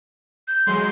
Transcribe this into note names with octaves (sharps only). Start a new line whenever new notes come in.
G6
E3 F#3 G#3 C6